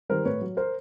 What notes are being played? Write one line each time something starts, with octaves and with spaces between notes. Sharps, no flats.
D#3 G3 A#4 C5
A2 B4 C#5
F#3
A#4 C5